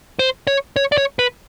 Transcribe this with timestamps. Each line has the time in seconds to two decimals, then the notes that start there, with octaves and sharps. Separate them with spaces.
0.19 C5
0.47 C#5
0.76 C#5
0.92 D5
0.98 C#5
1.19 B4